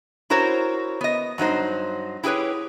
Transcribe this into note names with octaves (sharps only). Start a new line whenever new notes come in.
E4 F#4 A#4 C5 C#5
B3 D#5
G2 F#3 D#4 C5
E4 G4 G#4 B4 C#5